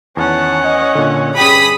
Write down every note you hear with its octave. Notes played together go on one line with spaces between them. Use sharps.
E2 D#3 C#4 F#5 A5
D#5
A#2 D3
G2 C#4 G#4 D5 G5 B5 D#6 B6